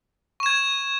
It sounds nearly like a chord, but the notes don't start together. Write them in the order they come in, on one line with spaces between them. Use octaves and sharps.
C#6 E7 G#6